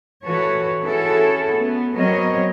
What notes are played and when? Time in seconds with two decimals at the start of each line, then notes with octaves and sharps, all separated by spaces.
0.24 E3 F#4 A4 B4 C#5
0.82 C#4 E4 F#4 G#4 A4
1.55 B3
1.96 F#3 B3 C4 A#4 C#5 D#5